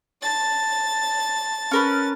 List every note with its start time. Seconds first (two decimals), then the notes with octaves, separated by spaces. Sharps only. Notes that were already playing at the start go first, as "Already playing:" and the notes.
0.22 A5 A6
1.71 C#4 A#4 B4